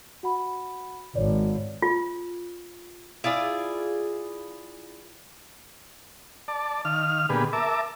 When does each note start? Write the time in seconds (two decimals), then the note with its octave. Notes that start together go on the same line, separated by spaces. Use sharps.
0.23 F#4 F#5 B5
1.15 G#1 C#5 D5
1.82 F4
3.24 E4 F4 G#4 D5
6.48 D5 A5
6.85 D#3 F5 F6
7.29 A#2 D3 B3 G4 G#4 B4
7.53 A#4 E5 A5 D6